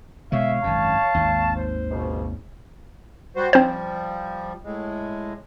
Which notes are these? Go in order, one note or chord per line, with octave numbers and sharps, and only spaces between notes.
B2 D3 G#3 C#5 E5 F5
G#1 F#2 A5
G#1 D#2
C5
C#2 G#2 B2
G3 F#4 C5
F3 G3 C4 C5
A2 G#3